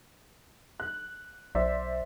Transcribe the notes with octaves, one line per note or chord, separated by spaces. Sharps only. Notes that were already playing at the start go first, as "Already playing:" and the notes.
F#6
B1 C5 D5 E5